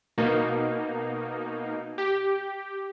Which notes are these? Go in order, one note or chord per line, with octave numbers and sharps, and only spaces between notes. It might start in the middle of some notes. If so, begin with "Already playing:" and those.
B2 A#3 D#4
G4